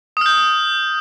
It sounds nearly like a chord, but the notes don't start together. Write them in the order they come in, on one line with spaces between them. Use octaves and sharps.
D#6 F6 G6